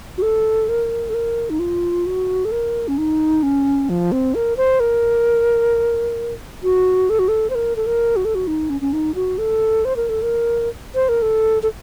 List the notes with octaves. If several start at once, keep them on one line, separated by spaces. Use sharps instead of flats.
F#4
A4
A#4
A4
A#4
D#4
F4
F#4
A4
A#4
C#4
D#4
C#4
F3
C4
A#4
C5
A#4
F#4
A4
F#4
A4
C5
A#4
A4
A#4
F#4
A4
F#4
D#4
C#4
C#4
D#4
F#4
A4
C5
A#4
A4
A#4
C5
A#4
A4
A4